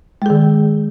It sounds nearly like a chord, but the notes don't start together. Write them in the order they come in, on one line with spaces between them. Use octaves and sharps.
G#3 G#4 D#3